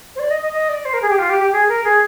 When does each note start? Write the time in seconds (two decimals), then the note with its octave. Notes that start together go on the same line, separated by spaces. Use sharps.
0.15 C5
0.19 D5
0.30 D#5
0.41 D#5
0.52 D#5
0.69 D5
0.85 C5
0.93 A#4
1.01 G#4
1.09 G4
1.18 F4
1.29 G4
1.40 G4
1.52 G#4
1.68 A#4
1.84 G#4